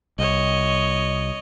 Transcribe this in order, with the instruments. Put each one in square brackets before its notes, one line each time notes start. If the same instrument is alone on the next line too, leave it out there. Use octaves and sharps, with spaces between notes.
[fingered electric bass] C2 [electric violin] C#5 D#5